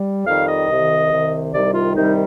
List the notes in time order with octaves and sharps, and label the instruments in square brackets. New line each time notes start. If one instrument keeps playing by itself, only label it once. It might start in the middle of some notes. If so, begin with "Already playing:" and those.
Already playing: [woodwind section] G3
F2 D#3 G3 F5
D#5
C2 C3 D#3
C2 C3 D#3
C2 C3 D#3 G3 D5
F4
C2 C3 D#3 G3 D#4